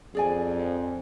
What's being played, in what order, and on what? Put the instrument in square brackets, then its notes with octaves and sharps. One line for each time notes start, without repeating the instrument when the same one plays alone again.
[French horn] F2 [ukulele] G#4 D5 G#5